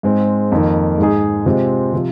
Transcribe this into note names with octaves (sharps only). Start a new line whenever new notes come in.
G#2 G#3 C4
F2 D#3 A#3
G#2 G#3 D#4 G#4
C3 G#3 C4 F4
C3 F3